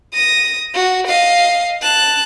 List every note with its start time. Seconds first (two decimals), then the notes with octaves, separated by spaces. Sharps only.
0.13 D#6 A#6
0.74 F#4
1.07 D#5 F5
1.81 A5 F#6